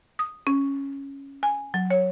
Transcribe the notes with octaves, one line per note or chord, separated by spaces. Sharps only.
D#6
C#4
G#5
F#3
C#5